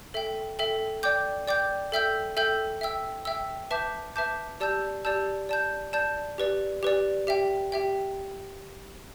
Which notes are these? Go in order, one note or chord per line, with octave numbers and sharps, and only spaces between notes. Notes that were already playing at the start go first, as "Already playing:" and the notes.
A4 E5 G5
A4 E5 G5
D5 G5 D6 G6
D5 G5 D6 G6
A4 E5 G5 E6 G6
A4 E5 G5 E6 G6
E5 G5 E6
E5 G5 E6
B4 E5 A5 D6 G6
B4 E5 A5 D6 G6
G4 D5 A5 E6 G6
G4 D5 A5 E6 G6
D5 A5 G6
D5 A5 G6
G4 B4 D5
G4 B4 D5
G4 E5 G5
G4 E5 G5